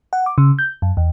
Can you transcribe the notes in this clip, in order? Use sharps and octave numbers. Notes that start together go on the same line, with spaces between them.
F#5
D6
C#3
G6
F#2
E2